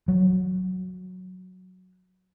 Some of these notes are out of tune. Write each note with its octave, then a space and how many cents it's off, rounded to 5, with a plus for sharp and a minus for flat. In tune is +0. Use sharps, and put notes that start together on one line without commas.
F#3 -5